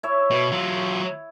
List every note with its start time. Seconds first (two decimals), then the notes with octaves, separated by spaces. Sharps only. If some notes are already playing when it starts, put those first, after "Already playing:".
0.03 E4 C#5 E5
0.30 B2
0.52 F#3 F4